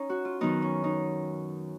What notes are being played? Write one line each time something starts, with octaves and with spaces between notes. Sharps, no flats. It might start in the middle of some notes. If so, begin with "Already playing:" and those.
Already playing: C#4 D#4
F#4
F4
F#2 D#3 F#3 B3 D#4
C#4
D#4